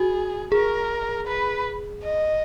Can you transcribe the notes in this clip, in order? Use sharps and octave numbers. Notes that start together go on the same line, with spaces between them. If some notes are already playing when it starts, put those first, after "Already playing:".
Already playing: F#4 G#4
G#4 A#4
B4
D#5